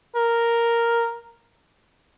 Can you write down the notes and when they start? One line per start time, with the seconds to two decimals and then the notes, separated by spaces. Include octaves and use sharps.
0.16 A#4